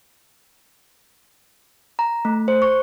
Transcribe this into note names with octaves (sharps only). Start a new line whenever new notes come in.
A#5
A3
C5
C#6